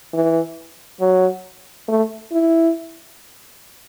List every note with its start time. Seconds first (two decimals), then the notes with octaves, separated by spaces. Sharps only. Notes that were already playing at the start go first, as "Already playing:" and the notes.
0.13 E3
1.00 F#3
1.89 A3
2.32 E4